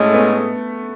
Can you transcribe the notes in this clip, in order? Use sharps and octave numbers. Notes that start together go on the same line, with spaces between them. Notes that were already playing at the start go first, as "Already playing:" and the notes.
Already playing: A2 G#3 A3 C#4 G#4 D#5
B3